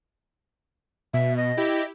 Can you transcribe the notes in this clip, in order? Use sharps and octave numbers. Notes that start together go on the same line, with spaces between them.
B2 E5
D#5
E4 G4